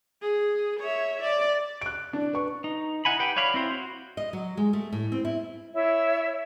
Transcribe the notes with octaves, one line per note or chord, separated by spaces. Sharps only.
G#4
C#5 E5
D5
F#6 D7
D4
B4 C#6
D#4
D#4 E4 F#5 G#5 B5
G4 B4 F#5 G5
F#4 C#5 D5 F5 B5
C4 E4 C5
F#4
D#5
F#3
G#3
A3
A2
C4
E4
E4 C#5 E5